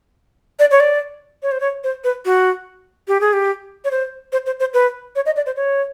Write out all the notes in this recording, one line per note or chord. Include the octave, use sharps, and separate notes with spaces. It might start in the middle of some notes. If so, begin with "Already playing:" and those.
D5
C#5
D5
C#5
C5
C#5
C5
B4
F#4
G4
G#4
G4
C#5
C5
C5
C5
C5
B4
C#5
D#5
D5
C5
C#5